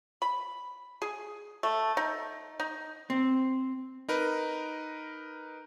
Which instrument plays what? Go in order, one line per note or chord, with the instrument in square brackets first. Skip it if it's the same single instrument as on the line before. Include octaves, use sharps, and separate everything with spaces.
[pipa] B5
G#4
A3
D#4
D#4
[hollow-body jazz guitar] C4
[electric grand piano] D#4 A#4 B4